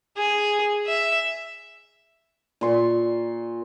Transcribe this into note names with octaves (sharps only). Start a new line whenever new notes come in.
G#4
E5
A#2 C6 C#6